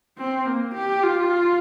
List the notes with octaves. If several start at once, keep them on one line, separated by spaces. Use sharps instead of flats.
C4
A#3
G4
F4